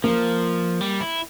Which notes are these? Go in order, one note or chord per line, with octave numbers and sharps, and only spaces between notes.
F3 A#3
G3
E4